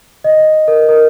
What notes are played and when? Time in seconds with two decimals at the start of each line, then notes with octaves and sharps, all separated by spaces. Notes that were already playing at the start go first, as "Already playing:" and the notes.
0.24 D#5
0.68 A#4
0.89 A#4